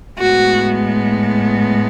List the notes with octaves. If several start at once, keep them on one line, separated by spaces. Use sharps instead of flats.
A2 G#3 B3 F#4